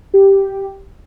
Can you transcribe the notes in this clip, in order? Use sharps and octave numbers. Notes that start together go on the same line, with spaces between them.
G4